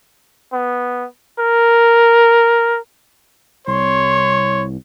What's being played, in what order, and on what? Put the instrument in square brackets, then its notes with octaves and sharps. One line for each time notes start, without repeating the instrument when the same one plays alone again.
[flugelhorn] B3
A#4
[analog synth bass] C2 [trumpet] C#5 [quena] C6